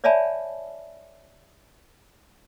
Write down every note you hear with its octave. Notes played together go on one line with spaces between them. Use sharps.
C#5 D5 E5 G#5 A5 B5